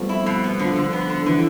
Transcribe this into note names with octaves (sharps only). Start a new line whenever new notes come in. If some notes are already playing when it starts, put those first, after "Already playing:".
Already playing: F3 G3 A3 B3 C4
E4
B2
B3
D3 F3
D3
B3
D3
D3 E3